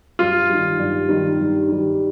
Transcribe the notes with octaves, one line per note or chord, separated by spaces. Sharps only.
G2 F4
D#3 G3
G2
D#3 G3
G2
D#3 G3